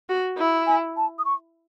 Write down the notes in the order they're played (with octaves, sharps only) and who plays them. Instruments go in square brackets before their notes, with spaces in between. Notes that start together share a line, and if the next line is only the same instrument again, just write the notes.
[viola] F#4
E4
[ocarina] G#5
A5
D#6
C#6